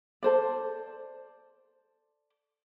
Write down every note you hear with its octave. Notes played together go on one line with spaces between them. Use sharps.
A4 C5 D5